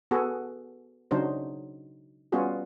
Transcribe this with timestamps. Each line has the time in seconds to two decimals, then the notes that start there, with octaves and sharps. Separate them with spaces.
0.11 B3 F#4 G#4 A4
1.11 C#3 F#3 D4 D#4 C5
2.32 G3 B3 C#4 F4 F#4 G#4